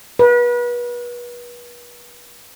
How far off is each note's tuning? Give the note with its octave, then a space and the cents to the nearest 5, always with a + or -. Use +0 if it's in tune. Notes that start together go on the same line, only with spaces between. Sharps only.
B4 -35